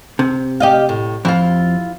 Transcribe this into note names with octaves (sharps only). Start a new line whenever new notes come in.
C3
G4 D#5 F5
A2
F2 E4 F4